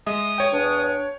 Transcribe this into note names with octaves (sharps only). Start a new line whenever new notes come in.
G#3 D#5 E5 D#6
C#5 G5
E2 D4